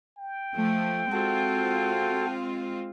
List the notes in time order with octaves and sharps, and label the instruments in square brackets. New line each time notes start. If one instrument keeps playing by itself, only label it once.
[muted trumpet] G5
[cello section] F3 A3
[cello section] G#3 C4 F4 [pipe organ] F#4 A4